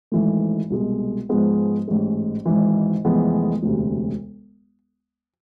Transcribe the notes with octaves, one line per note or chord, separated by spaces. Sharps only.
G#1 G#2 E3 A3
C2 B2 G#3
G#2 F3 G#3 B3
A1 G#2 G#3
G#1 G#2 E3
F1 F2 E3 G#3 B3
E1 D2 C3